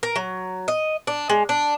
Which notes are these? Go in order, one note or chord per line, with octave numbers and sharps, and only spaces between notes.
A#4
F#3
D#5
D4
G#3
D4